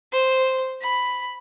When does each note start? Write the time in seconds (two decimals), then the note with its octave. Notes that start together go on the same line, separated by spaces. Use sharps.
0.12 C5
0.81 B5